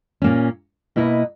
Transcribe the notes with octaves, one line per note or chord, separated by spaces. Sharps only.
A#2 A#3 C#4
B2 A#3 E4 B4 D#5